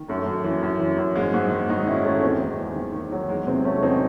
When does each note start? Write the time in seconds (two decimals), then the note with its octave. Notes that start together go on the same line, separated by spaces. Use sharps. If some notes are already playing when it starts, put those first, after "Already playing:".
Already playing: D#3
0.08 F#2 A3
0.26 F#2
0.44 E3
0.62 F#2
0.80 E3
0.98 F#2
1.15 G#2 G#3
1.34 G#2
1.51 D#3
1.69 G#2 D#4 F#4
1.86 D#3 C#4 E4
2.04 D#3 A3 C#4
2.23 E2 G#3 C4
2.41 E2
2.58 E2
2.76 D#3
2.94 D#3
3.12 F#3
3.29 E2 G#3
3.47 C3 G#3 C4
3.65 F#3 A3 C#4
3.82 E2 C4 D#4